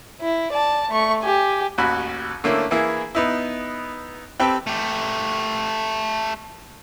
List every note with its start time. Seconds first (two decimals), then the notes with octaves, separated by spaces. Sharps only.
0.21 E4
0.53 D5 A5
0.91 A3 C#6
1.22 G4 G#5
1.78 A1 D#2 F#4 B5
2.44 D3 A3 A#3 C#4 E4
2.71 E3 A#3 E4 G#4
3.15 B3 D#4 E4
4.40 C4 G4 A4 B4
4.67 A3 G4